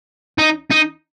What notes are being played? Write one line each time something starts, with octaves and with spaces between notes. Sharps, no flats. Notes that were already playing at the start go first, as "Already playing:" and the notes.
D#4
D#4